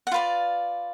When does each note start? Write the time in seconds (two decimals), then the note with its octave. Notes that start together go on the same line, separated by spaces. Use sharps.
0.07 F#5
0.12 F4 B4 D5 F5